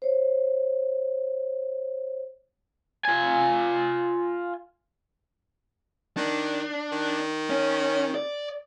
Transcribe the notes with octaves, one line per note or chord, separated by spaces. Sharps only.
C5 C#5
F4 G#5
D#3 D4
D#3
C#4
D5